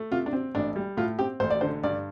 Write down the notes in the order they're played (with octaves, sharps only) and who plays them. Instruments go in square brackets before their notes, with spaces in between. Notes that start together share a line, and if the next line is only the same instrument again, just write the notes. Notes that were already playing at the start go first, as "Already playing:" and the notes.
Already playing: [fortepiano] A3
C3 F4
D4
C4
A1 D4
G3
A2 F4
C4 G4
A1 C5
D5
D3 C5
G2 D5